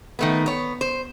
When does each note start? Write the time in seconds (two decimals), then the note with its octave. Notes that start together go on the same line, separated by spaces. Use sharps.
0.19 D#3 A3 B3
0.46 B3 C#5
0.81 C5